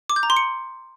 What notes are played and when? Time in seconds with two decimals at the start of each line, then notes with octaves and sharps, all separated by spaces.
0.10 D6
0.16 G6
0.23 A#5
0.30 C6
0.37 C#7